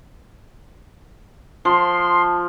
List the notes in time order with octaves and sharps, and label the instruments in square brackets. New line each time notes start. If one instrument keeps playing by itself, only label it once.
[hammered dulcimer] F3 [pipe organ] C6